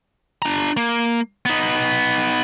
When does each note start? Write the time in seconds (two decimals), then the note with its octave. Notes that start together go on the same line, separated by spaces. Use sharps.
0.42 D4 A#5
0.77 A#3
1.45 B3 D#4